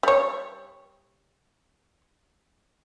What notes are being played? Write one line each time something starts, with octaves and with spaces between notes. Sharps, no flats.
G3 C#5